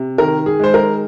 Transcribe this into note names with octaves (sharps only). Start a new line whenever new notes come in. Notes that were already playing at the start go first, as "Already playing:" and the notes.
Already playing: C3
D#3 A#4
G#4
G#3 C5
A#4